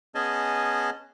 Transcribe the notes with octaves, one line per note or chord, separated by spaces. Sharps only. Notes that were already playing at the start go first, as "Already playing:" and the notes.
B3 C#4 G#4 D#5 G#5 A5